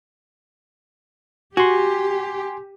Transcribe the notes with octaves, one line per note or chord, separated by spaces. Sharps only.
F#4 G4 G#5 C6